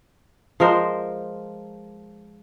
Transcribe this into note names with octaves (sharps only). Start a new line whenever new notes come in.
F3 G#3 A#4 C5